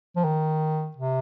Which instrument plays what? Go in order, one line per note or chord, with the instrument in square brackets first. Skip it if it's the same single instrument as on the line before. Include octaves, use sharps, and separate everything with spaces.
[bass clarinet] F3
D#3
C3